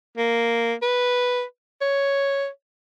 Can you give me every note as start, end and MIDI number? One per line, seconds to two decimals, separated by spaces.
0.18 0.74 58
0.82 1.43 71
1.81 2.48 73